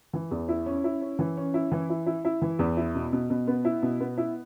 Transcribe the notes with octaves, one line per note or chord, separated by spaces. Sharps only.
E3
E2
E4
C#4
E4
C#4
E3
C#4
E4
E3
E4
E4
E4
E3
E2
E4
B2
B2
B2
B3
E4
B2
B3
E4